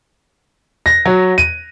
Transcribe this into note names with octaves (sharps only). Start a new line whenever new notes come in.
A#6
F#3
D#7